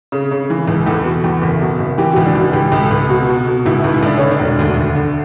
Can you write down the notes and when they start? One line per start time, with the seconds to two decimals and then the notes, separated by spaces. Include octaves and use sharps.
0.12 C#3
0.31 C#3
0.50 E3
0.67 C#2
0.86 E2 A4
1.05 B2
1.24 E2
1.42 F#1
1.61 B2
1.79 F#1
1.98 E3 G4
2.12 C#2 F#4
2.26 D4
2.35 E3 F#4
2.53 C#2 G4
2.72 C#2
2.82 A4
2.91 C#2
3.09 B2 F#4
3.28 B2
3.47 B2
3.66 C#2 E4
3.84 C#2
3.94 E4
4.03 C#2 D4
4.18 D3 C#4
4.30 D4
4.39 E1
4.59 D2
4.76 D2
4.95 D3